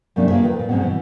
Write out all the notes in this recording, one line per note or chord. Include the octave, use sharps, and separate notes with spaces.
F#2 C3 A3 A#3 D4
A#3 D4 F4 G#4 E5
F2 D#3 B4
A#2 A#3
F2 G#2 B2 C4 C#4 F#5
B2 E3